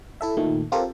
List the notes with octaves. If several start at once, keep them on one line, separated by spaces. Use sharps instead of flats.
E4 A4 E5
A#2 D#3 A3
C4 F4 G4 A4 A#4